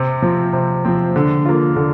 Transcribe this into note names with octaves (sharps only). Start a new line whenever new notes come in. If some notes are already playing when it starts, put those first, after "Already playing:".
Already playing: C3
F3 C4
C3
F3 C4
D3
A#3 F4
D3